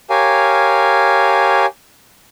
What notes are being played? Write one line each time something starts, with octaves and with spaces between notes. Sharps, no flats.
G4 A#4 C#5 F5 G#5